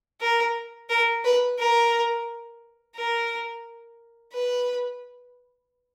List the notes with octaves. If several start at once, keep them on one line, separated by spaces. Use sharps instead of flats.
A#4
A#4
B4
A#4
A#4
B4